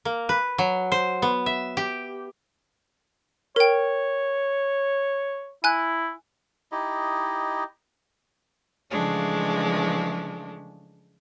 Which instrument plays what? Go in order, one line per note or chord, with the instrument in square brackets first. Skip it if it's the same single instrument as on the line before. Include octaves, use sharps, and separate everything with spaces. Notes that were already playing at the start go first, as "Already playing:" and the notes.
[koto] A#3
B4
F#3
C5
B3
E5
G4
[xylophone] A#4 G5 [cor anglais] C#5
[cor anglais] E4 [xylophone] G#5 F#6
[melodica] D#4 E4 G4 D#5
[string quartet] C#3 E3 F3 G#3 A3 D4